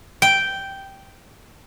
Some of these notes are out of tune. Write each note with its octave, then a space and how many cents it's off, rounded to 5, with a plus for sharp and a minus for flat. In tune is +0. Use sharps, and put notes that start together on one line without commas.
G5 -5